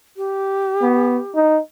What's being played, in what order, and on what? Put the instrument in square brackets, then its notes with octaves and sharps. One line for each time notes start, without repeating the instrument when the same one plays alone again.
[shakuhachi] G4
[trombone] B3
D#4